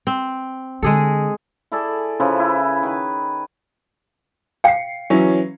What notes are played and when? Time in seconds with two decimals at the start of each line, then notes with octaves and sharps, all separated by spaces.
0.07 C4
0.83 D3 G#3 G#4 A4
1.72 E4 G#4 A4 D5
2.20 C#3 F3 E4 B4
2.39 E4 G#5
2.83 D#3 B4
4.64 F5 G5 C7 C#7
5.10 E3 F#3 C#4